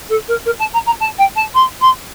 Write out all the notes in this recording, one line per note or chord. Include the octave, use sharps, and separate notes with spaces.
A4
A#4
A#4
A5
A#5
A#5
A5
G5
A5
C6
C6